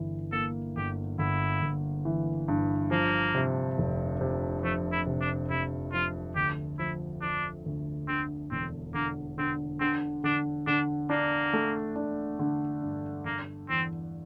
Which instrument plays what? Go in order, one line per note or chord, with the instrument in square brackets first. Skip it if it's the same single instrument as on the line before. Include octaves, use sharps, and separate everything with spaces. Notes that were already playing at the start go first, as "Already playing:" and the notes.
Already playing: [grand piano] G1 E3
[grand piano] A#3 [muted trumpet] A4
[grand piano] G1 [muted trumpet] G4
[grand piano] G1 [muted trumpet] E4
[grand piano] G1
E3
G2
[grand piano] F3 [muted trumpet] A#3
[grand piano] C3
F1
C3
[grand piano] F3 [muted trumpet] A3
[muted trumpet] E4
[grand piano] C3
[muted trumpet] D4
[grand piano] C3 [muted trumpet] E4
[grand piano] F3 [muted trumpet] F4
[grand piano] D2 [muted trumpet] G4
[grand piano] F3 [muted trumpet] E4
[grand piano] F3 [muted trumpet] D4
[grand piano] D2
[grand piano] D3 [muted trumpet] C4
[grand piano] E1 [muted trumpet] C4
[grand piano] D3 [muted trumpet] A#3
[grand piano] D3 [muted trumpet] C4
[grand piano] D3 [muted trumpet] C4
[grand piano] D3 [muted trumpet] D4
[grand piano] D3 [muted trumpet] D4
[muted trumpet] A#3 [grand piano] D4
[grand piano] A3
D4
D3
G2
[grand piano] D3 [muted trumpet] A#3
[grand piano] E2 [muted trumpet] C4